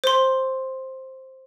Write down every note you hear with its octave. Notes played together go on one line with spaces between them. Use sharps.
C5 C6